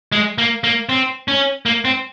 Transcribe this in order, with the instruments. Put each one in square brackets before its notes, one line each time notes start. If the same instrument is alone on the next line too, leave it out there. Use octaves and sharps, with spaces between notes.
[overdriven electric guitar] G#3
A#3
A#3
C4
C#4
A#3
C4